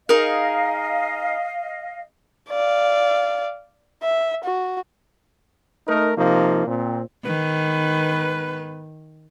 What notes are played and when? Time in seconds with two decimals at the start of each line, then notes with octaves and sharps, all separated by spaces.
0.09 D#4 G#4 A#4 D#5 F5
2.50 D5 F5
4.03 E5
4.44 F#4
5.88 A3 D#4 A#4
6.17 C3 F3 A#3 D#4
6.67 A#2 C4
7.26 G#2 D#3 B3 B4